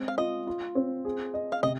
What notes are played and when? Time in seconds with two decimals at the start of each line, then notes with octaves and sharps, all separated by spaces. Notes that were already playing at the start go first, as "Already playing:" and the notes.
Already playing: G#3 C4
0.08 F5
0.18 F4 D#5
0.47 F4
0.75 C4
1.05 G#4
1.34 D#5
1.52 F5
1.63 C3 D#5